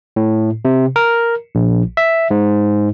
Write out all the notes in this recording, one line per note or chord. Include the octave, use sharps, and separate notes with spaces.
A2
C3
A#4
A#1
E5
G#2